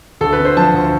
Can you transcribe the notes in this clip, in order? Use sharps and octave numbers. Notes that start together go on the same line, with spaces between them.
D2 A4
B4
D3
C5
F3 A5
D2